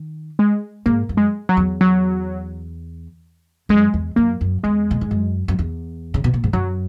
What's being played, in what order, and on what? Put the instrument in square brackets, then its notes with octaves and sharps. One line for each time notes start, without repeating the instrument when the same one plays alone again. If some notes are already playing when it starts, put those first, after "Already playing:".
Already playing: [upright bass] D#3
[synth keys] G#3
[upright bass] G#2 [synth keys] A#3
[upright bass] F#2
[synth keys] G#3
F#3
[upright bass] E2
[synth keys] F#3
[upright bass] F#2 [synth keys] G#3
[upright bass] E2
[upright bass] F#2 [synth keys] A#3
[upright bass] F#2
[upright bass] E2 [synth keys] G#3
[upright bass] A#2
G#2
F#2
F#2
E2
C#3
B2
A#2
G#2
[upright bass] F#2 [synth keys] F#3